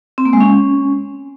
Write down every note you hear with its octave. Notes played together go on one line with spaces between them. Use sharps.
C4
A#3
G#3
C#4